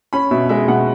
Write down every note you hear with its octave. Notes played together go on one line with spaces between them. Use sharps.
C#4 B5
B2 E5
G#3 E5
B2 F#5